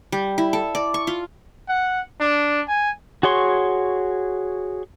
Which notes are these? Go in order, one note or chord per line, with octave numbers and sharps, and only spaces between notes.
G3
E4
A4
D5
C#6
F4
F#5
D4
G#5
F#4 G#4 C#5 C6 C#6